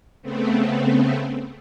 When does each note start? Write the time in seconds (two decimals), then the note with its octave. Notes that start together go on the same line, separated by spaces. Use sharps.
0.22 C#3 A3 B3 C4